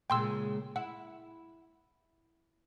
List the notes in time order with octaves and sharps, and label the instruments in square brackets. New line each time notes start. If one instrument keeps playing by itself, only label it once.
[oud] A#2 C#3 G#3 [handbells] G5 C6 E6
[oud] E4 [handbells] F#5